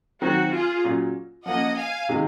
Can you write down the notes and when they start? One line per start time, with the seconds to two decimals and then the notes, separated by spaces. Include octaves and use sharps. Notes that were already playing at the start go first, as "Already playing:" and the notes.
0.21 D#3 F#3 C4 F#4
0.52 F4 G#4
0.84 A#2 F#3 C#4
1.46 F3 A#3 C#4 D#5 F#5
1.77 F5 G#5
2.09 C3 D#3 G#3